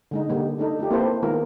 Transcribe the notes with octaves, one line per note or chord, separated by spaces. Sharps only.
D3 G#3 D#4
D3 G3 A#3
A3 D4 D#4 A4
A3 D4 F4 G4
A#3 C4 E4 A4 B4 C5
D#3 G#3 B3 F4 A#4